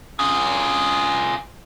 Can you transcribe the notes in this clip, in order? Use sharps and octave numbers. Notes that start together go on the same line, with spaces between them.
F4 G#4